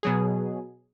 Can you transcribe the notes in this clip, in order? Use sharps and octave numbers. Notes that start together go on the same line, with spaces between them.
B2 F#3 G#4